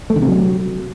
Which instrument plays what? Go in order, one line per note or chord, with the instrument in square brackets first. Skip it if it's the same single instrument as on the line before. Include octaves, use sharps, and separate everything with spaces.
[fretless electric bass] A3
D3
C3
F#3